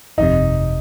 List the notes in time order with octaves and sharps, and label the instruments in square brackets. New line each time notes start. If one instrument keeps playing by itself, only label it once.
[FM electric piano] G1 F2 C3 [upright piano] D#4